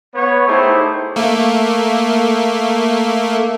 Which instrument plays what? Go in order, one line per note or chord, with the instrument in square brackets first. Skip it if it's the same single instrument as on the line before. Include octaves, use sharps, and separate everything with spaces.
[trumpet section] B3 C#5
A3 D#4 E4 G4 G#4 C5
[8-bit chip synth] A3 A#3